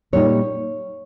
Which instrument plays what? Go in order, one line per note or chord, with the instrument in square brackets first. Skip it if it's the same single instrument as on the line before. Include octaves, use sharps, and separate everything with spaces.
[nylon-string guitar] A#2 G3 A#3 D#4 C#5